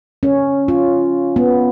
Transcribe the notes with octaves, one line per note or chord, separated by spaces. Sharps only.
C#4
F4
B3